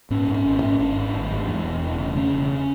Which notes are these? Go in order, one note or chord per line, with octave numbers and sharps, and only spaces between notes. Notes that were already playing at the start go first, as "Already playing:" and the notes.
G#2 C#4
G#2
C#4
G#1
C#4
G#2
G#1 D4
G#2
G#1
G#2
E2
E1
E1
C#3
C#3 C#4
E1